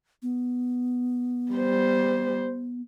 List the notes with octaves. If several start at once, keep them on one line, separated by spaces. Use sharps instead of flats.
B3
G3 C5